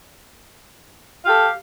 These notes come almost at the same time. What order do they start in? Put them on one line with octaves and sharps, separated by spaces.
F5 G4 A4